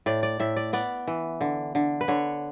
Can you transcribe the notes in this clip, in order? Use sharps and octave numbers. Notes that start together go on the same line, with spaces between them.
A2 D5
D5
A2 E5
D5
B3 D5
E3
D3
D3
B4
D3 C#5